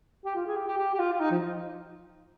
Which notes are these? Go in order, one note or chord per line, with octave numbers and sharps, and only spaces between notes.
G4
F4
G#4
G4
G4
G4
G4
F4
F4
D#4
F3